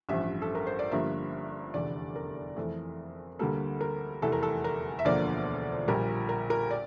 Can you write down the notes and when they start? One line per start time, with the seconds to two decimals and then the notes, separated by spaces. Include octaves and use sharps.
0.09 A1 G2 F3 E5
0.42 A4
0.55 A#4
0.67 C5
0.79 D5
0.91 G1 G2 F3 A#3 E5
1.74 F1 E2 D3 D5
2.16 A#4
2.56 F2 E3 A3
3.39 D2 D3 G3 A#3 A4
3.81 A#4
4.22 F1 E2 E3 A3 A4
4.32 A#4
4.43 A4
4.64 A#4
4.99 E5
5.05 E1 D2 D3 F3 A#3 D5
5.88 A#1 A#2 G3 A#4
6.29 A#4
6.50 A#4
6.71 D5